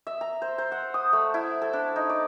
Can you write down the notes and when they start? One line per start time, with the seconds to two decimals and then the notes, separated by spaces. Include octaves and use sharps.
0.07 E5
0.21 A#5
0.42 C5
0.58 C5
0.72 F#5
0.94 D#6
1.13 A3
1.34 E4
1.62 A4
1.73 D4
1.96 D#4
2.09 D5